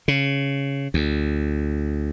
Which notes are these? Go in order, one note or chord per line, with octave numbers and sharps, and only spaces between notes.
C#3
D2